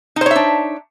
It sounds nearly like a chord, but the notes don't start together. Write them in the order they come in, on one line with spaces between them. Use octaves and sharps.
D#4 C5 C#5 E5 D4